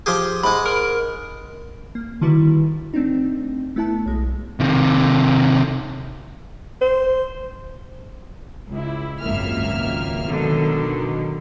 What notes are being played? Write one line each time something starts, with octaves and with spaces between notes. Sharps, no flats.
F3 G4 G#4
G#2 G#3 B5
A#4
A#3
D3 D#3 G3 E4 F#4 B4
A3 C4 D4 D#4
A3 B3 E4 E5 A5
B1 G#3
C3 D#3
C5
C#2 E4
G#1 C#2 F#2 A#3 E5 F6
B2 D3 D#3 F#3